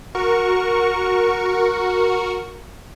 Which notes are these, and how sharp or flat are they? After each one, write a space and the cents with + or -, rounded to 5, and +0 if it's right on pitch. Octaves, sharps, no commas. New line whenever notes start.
F#4 -10 A#4 +0 C#6 +0